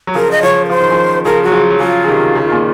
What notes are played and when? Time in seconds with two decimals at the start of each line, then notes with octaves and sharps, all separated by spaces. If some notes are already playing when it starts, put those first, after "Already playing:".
0.07 F#3
0.15 C#3 F3 A#4
0.31 D#5
0.42 C#3 F3 C#5
0.65 A#4
0.69 F3 C5
0.80 D#3
0.91 C#3 F3
1.25 C#3 F3 A#4
1.43 F#3 F#4
1.52 C#3 F3
1.70 F#3
1.80 C#3 F3 F4
2.04 C#3
2.08 C3 D#3
2.35 C#3
2.44 D#3
2.52 A#2 C#3